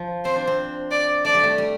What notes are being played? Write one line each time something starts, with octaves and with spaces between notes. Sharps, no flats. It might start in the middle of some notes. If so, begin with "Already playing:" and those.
Already playing: F3
C4 C5
D4
C4
D5
A3 D5
G3
A3
G3